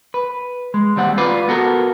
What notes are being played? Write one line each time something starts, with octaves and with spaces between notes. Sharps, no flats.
B4
G#3
D#2 G3 C4 F#5
F4 B4 D5
B3 F#4 A4 A#4